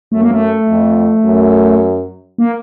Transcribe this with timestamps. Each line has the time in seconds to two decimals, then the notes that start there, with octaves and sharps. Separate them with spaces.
0.12 F#2 A3
0.22 A#3
0.31 A3
0.68 F2
1.25 F#2
2.38 A#3